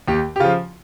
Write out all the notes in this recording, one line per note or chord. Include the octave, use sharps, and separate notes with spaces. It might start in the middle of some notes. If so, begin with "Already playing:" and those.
D#2 G4
G4
C#3 F3 F4